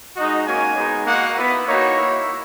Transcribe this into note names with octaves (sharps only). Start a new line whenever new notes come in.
G#3 D#4 F#4 D#5
A#3 C#4 F#4 G#5
G#3 B3 D#4
A#3 D#4 F#4 F#5
B3 E4 B4
A#3 D#4 F#4 C#5
A#3 E4